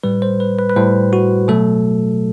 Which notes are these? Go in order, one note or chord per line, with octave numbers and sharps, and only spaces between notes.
A2 G3 B4
C5
B4
B4
B4
A2 G3 C5
F#4
B2 F#3 A3 A4